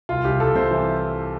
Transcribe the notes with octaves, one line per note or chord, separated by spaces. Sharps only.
C2 F4
C2 G4
C2 A4
C3 C5
E3